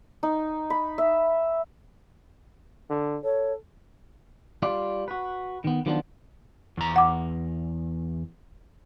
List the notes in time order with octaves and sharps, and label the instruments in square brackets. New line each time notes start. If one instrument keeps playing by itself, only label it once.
[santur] D#4
B5
E5
[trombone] D3
[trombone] A4 [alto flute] C#5
[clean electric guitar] G3 F4 D5
F#4 B4
D#3 B3
D#3 F3 F#3 B3 D4 F4
[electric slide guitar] E2 A#5
[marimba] F#5 D6